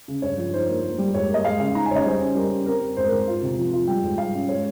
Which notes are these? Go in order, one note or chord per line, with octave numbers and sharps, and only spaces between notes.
C#3
G2 C#5
F3
D#4 C5
A#3
A#3
G3
G#2 C#5
A#3 D#5
G#3 F5
C#3 F5
D#4 A#5
G#5
C#3 C#5 D#5
G3 C5
C#4
G3 A#4
C#4
C4 A#4
C4
G#2 C5
A#4
G#2
F4
C3
F3
F4
G3 G5
G#2
G3 F5
C#4
G#3 C#5